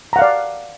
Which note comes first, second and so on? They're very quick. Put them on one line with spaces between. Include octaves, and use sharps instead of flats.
A#5 F#5 F5 D5